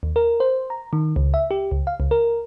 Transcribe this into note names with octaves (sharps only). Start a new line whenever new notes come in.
D#2
A#4
C5
A#5
D#3
C#2
E5
G4
C#2
F5
C#2
A#4